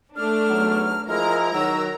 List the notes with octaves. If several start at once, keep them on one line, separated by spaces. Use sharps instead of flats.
A3 D4 F6
B1 E2 F#3
F3 G#3 E4 A#4 A#5 F6
D#3 F#3 E6